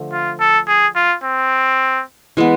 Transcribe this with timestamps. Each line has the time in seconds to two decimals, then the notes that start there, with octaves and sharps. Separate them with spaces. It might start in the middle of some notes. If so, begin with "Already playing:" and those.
Already playing: D3 F3 A3
0.12 F4
0.40 A4
0.68 G#4
0.96 F4
1.24 C4
2.37 E3 G#3 B3